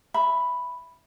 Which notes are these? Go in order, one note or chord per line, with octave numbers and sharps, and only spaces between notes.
E5 B5